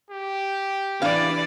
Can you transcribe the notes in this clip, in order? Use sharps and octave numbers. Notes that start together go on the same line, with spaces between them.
G4
E3 D4 D5 F5